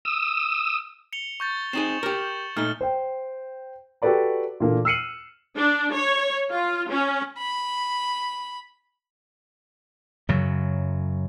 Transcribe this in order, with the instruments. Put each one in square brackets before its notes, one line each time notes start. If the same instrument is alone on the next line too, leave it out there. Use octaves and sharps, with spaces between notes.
[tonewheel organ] D#6 E6
[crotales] C#7 F7 G7
C#6 G6 A6
[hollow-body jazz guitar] C4 D#4 G#4 [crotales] E7 F#7 G7
[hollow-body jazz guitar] G4 A#4
[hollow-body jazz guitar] A#2 A3 D#4 [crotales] F6 G7
[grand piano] C5 G5
F#4 G4 A4 B4 D5 A#5
A#2 E3 A#3 D4 A4
E6 F6 C7 C#7 D#7 F#7
[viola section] D4
C#5
F4
C#4
[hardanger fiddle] B5
[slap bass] F#2 C#3 F#3